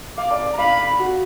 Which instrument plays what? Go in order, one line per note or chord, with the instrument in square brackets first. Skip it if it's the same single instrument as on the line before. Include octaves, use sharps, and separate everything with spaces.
[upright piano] F5 [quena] D6
[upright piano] D5
[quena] A#5
[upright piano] F5 [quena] B5
[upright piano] F#4